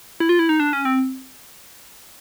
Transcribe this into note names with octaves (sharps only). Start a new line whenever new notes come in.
E4
F4
E4
D#4
D4
C#4
C4